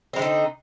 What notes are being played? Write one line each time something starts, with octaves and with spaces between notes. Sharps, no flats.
D3 G#3 C4 D#4